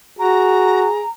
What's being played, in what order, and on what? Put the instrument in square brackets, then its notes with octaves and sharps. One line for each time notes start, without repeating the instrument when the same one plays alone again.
[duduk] F#4 [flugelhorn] G#4 [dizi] A#5